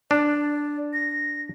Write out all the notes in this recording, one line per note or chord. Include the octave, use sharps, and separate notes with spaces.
D4 D5
A#6